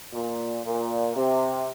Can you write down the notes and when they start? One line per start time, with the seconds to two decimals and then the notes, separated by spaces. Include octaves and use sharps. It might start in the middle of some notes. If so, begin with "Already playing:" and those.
0.13 A#2
0.64 A#2
1.16 C3